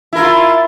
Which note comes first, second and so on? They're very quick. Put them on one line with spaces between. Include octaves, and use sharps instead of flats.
E4 A#4 F4